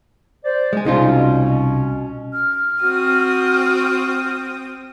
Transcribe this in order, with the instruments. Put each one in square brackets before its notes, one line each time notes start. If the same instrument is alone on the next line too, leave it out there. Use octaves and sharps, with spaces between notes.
[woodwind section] C5 D5
[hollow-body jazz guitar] G#3 G#4
[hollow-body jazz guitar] C2 D#4 F4 [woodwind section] B2 C#4
[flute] F6
[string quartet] C4 G5 D#6 [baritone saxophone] F#4